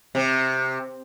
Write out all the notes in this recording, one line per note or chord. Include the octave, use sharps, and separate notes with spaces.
C3